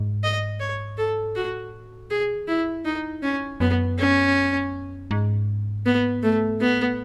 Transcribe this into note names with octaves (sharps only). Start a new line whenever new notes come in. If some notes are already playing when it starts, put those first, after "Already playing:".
Already playing: G#2
D#5
C#5
A4
A2 F#4
B2 G#4
D#3
E4
F#2
E2 D#4
F#2 C#4
F#2 B3
C#4
G#2
B3
A3
A2 B3